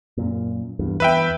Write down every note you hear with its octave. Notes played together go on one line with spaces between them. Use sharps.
F#2 A#2
E2 G2
E2 B4 E5 G5